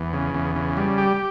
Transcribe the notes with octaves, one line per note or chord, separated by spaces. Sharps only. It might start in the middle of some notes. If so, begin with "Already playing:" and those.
Already playing: E2
C#3
E2
C#3
G3
G4